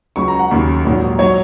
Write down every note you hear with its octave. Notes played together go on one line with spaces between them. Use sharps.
C#2 C#3 F#3 C#6
A#5
F#5
D#2 C#3 F#3
A#1 G#2 F#3
F#3 C#5